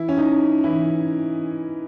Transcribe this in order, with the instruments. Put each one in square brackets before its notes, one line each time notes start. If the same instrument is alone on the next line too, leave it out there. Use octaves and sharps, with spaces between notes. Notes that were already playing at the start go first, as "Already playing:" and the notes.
Already playing: [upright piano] E3 E4
C#4
D#4
E3 E4